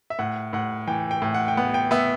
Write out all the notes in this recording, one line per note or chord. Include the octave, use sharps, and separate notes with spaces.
E5
A2 F#5
A2 F#5
E3 G5
G5
A2
F#5
G5
B3 F#5
G5
B3 E5